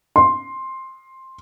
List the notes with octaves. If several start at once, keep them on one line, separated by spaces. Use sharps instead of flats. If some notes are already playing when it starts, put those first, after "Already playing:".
C6